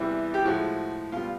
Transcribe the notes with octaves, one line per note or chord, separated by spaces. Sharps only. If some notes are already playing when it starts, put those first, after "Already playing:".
Already playing: E2 C3 E3 G3
G4
A2 F3 G#3 F#4
B2 G3 F4